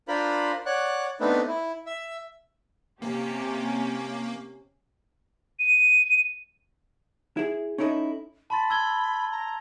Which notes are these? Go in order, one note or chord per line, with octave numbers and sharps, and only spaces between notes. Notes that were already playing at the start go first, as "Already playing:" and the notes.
D4 F4 A#4 C5 B5
C#5 D5 F#5 F#6
A3 B3 C4 D4 D#4 B4
E4
E5
C3 A#3 C#4 G4
D#7
E4 G#4
C#4 D#4 E4 A4 A#4 D#5
A5 B5 C6 A6
E6 G#6 G7
A#5